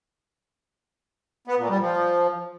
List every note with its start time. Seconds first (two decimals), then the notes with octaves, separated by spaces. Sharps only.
1.47 B3
1.58 A#2
1.69 G3
1.80 F3